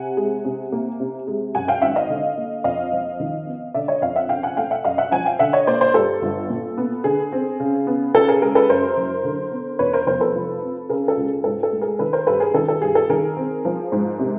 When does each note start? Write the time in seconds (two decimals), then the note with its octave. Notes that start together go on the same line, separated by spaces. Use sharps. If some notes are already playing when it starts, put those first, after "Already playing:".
Already playing: C3 F#5 G#5
0.17 G#3
0.45 C3
0.72 A#3
1.00 C3
1.27 G#3
1.55 F#2 F#5 G#5
1.68 F5 G5
1.82 G#1 E5 F#5
1.96 D#5 F5
2.09 D3
2.37 A#3
2.64 F2 D#5 F5
2.92 F3
3.20 D#3
3.47 B3
3.74 D3 D5 E5
3.88 C#5 D#5
4.02 F2 D#5 F5
4.16 E5 F#5
4.29 C#3 F5 G5
4.43 F#5 G#5
4.57 A3 F5 G5
4.71 E5 F#5
4.85 F#2 D#5 F5
4.98 E5 F#5
5.12 F3 F#5 G#5
5.25 F5 G5
5.39 D3 E5 F#5
5.53 C#5 D#5
5.67 A#3 C5 D5
5.81 C5 D5
5.94 G2 A4
6.22 G1
6.49 A#2
6.78 B3
7.04 D3 G#4
7.32 C4
7.60 C#3
7.87 B3
8.15 C#3 A4
8.28 G#4 A#4
8.42 G#3 G#4 A#4
8.55 A4 B4
8.69 F#2 A#4 C5
8.97 F#1
9.24 D3
9.51 B3
9.79 E2 B4 C#5
9.93 A#4 C5
10.06 F1 A#4 C5
10.20 A4 B4
10.35 F3
10.62 C4
10.89 C#3 G#4 A#4
11.08 A4
11.17 C#2
11.26 G#4
11.44 G#2 A4
11.63 A4
11.72 A3
11.81 G#4 A#4
11.99 D#3 A4 B4
12.13 A#4 C5
12.27 G2 A4 B4
12.40 G#4 A#4
12.54 D#3 A4
12.68 A4
12.82 G2 G#4
12.95 A4
13.09 D#3 G#4 A#4
13.36 C4
13.65 F3
13.92 G#2
14.19 C3